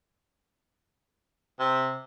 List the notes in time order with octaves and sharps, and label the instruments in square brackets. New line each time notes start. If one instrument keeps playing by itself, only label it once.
[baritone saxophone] C3